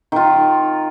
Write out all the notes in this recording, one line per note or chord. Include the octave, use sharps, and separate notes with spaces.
D#3 F4